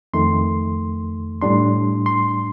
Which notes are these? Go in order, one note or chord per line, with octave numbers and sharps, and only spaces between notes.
F2 D#3 A3 C6
A2 G3 D4 C6
C6